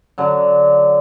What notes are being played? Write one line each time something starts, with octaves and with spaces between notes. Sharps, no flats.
D3 F#3